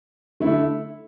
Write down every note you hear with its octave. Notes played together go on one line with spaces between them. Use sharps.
D3 A3 E4